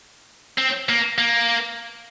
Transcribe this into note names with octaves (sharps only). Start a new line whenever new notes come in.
C4
A#3
A#3